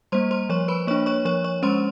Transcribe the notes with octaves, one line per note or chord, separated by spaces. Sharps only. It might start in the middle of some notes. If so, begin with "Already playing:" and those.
G3 A#3 C5 C6
C5 C6
F3 C#5 C#6
B4 B5
A#3 D4 C#5 C#6
C#5 C#6
F3 C#5 C#6
C#5 C#6
G#3 C#4 C5 C6